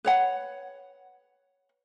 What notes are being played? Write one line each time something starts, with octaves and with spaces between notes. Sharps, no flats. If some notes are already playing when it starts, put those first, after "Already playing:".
B4 C#5 F#5